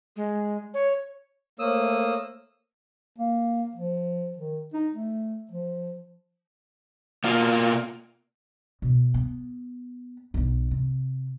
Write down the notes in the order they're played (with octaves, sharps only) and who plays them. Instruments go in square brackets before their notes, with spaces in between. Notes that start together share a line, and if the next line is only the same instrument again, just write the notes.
[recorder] G#3
C#5
[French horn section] A3 C5 C#5 [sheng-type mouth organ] A#3 D#6 E6
[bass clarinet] A#3
F3
D#3
D#4
A3
F3
[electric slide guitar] B2 A#3 F4
[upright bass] B2
B3
D1 B1
C3